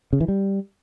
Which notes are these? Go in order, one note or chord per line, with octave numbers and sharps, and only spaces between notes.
C#3
E3
G3